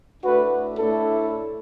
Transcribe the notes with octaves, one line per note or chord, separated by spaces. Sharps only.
A2 A3 D4 F#4 B4
A2 A3 D4 E4 A4